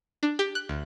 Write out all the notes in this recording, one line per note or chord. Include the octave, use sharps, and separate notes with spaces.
D4
G4
F#6
D2